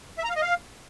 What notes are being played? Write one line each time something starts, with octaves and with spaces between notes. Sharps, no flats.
E5
A#5
F5
D#5
F5